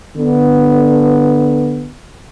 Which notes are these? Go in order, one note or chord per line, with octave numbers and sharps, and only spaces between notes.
D3 B3